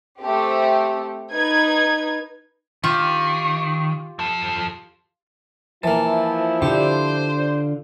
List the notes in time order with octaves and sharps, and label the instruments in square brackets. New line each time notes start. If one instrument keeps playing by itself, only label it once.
[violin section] A3 C4 G4
D#4 B4 G#6
[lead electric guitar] D#3 [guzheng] F4 G4
[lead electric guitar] F3 A4
[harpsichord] E3 A#3 [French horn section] F3 E4 [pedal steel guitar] A5
[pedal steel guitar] D3 F4 [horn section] D4 C5 [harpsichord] G4